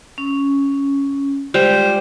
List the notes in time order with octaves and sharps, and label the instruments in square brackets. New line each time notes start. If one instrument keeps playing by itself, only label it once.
[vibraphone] C#4
[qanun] G3 [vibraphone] G#3 F4 [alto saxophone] C5